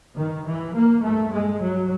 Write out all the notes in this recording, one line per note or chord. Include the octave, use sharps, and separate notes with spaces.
G2 D#3
E3
A#3
G2 A3
G#3
F#3